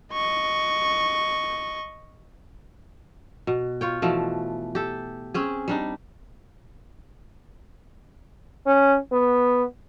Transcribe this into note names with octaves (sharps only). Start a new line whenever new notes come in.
D#5 C#6
B2
F4 C#5 G5
B2 E3 F3 A3
G4 A4
C4 C#4 G#4
G3 D4 D#4
C#4
B3